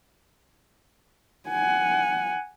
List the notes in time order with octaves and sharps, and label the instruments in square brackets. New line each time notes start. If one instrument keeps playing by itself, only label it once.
[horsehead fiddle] F#5 G#5